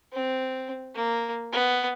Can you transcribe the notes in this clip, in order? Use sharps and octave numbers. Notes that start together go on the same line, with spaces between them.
C4
A#3
B3